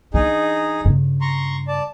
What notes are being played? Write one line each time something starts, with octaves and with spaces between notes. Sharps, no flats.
E3 D4 D#4 G#4
G2 C#3
A#5 C6 C#6
D5 A5